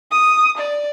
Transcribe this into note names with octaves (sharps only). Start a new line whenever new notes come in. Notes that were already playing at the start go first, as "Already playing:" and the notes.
D#6
D5